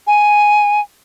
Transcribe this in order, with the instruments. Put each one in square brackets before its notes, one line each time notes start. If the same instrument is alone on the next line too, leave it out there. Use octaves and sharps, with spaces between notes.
[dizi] G#5